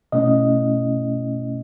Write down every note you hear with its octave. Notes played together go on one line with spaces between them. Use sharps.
B2 A3 C#4 E4 D#5